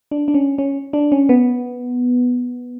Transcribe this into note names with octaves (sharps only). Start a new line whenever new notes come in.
D4
D4
C#4
C#4
D4
C#4
B3